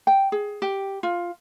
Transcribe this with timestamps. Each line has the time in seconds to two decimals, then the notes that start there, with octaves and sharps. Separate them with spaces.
0.07 G5
0.32 G#4
0.62 G4
1.03 F4